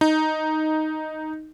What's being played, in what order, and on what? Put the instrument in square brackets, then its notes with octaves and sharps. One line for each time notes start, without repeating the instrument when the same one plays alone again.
[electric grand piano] D#4